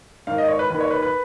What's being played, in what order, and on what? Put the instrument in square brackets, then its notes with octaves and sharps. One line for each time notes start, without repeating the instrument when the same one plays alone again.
[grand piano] G#2 D#3 F5
D#5
C#5
B4
D#2 D#3 B4
C#5
B4
B4